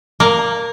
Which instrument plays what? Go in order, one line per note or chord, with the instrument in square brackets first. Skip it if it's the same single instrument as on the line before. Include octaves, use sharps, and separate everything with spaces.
[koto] A#3